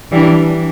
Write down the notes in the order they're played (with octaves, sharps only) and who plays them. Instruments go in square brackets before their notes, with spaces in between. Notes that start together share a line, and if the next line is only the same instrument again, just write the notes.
[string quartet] E3 G3 D4